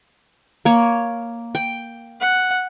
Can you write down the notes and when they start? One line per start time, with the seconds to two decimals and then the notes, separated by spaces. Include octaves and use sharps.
0.65 A#3 C#5
1.55 G5
2.21 F#5